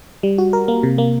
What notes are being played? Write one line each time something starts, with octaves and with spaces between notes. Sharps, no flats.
G3
F#4
A#4
A#3
C3
A#3